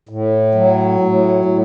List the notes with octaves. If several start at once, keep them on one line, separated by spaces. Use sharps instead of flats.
A2
F#3
A2
A2